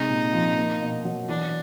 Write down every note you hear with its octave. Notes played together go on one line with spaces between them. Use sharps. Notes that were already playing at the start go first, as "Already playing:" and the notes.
Already playing: C3 G#3 D#4
A#2
F3
A#3
B2
F#3
E3 D4